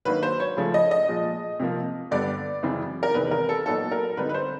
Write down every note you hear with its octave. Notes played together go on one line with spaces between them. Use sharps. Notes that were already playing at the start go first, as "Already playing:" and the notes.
D#3 F#3 A#3 D4 B4
C5
C#5
C#3 F3 A3 C#4
D#5
D#5
A#2 F3 G#3
C3 F3 A#3
G2 D3 G3 B3 D5
F#2 C#3 E3 G#3 C4
A#4
E2 C3 D#3 G#3 B4
A#4
A4
A#2 F#3 B3 D#4 A4
A#4
D3 G3 C4 D#4 B4
B4
C5